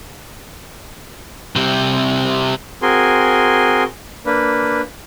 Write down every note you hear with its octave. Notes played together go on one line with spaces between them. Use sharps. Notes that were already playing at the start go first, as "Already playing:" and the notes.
C3 G3
C4 F#4 G#4 A#4 G#5 C6
A#3 D4 B4